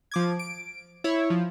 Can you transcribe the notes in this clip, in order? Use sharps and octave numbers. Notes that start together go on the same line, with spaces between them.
F3 D6 G#6
D7
E4 C#5
F3